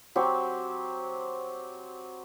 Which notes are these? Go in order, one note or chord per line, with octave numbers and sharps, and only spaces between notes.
F#3 C4 G4